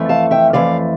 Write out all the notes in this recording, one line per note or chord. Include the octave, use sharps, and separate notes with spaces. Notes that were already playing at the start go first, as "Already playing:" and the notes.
Already playing: F2 E3 A3
F5 A5
E5 G5
F2 E3 A3 D5 F5